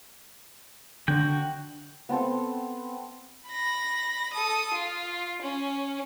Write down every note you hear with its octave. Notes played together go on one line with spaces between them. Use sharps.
D3 C4 D4 F#4 G5 G6
B3 C4 A4 C5
B5 A#6
A4 D#6
F4
C#4